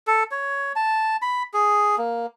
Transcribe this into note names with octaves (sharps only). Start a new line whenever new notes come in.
A4
C#5
A5
B5
G#4
A#3